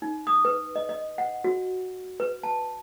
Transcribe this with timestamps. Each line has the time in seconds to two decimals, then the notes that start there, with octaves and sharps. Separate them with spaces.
0.02 D#4
0.27 D#6
0.45 B4
0.76 D#5
0.89 D#5
1.18 F#5
1.44 F#4
2.20 B4
2.43 A5